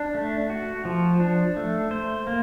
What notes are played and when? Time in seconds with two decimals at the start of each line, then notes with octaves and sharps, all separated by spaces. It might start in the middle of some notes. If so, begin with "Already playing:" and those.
Already playing: D4
0.15 A3
0.50 F#4
0.85 F3
1.20 D4
1.57 A3
1.91 C5
2.27 A#3